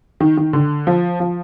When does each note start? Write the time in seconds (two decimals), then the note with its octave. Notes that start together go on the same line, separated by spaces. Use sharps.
0.20 D#3
0.37 D#3
0.53 D3
0.87 F3
1.20 F3